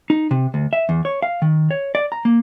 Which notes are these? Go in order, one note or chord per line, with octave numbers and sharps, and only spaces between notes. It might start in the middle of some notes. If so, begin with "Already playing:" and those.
D#4
C3
D2
E5
E2
C#5
F5
D#3
C#5
D5
A#5
A#3